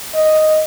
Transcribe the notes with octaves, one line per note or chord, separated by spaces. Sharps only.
D#5